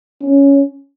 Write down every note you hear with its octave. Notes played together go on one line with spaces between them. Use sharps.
C#4